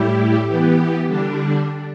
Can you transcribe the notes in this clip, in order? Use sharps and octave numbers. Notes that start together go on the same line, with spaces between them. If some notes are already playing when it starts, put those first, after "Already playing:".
Already playing: A2 G3 E4 G4
E3 B3 G4
D3 G3 D4